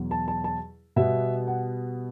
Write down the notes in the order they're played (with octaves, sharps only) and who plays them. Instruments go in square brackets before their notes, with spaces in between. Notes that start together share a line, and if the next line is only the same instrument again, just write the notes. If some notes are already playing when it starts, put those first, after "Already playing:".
Already playing: [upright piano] E2 B2 F#3
A5
A5
A5
B2 G3 B3 E5
F#5